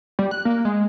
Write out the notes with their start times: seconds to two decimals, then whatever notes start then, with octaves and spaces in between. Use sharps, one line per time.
0.19 G3
0.31 F#6
0.45 A#3
0.65 G#3